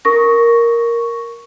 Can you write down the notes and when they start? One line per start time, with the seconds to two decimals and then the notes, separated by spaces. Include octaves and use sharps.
0.05 A#4 C#6 A#6